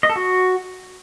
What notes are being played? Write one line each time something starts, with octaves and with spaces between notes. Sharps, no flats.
D#5
A4
F#4